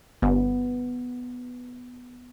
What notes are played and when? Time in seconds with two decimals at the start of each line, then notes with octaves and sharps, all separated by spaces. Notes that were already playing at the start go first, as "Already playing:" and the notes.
0.22 G1 B3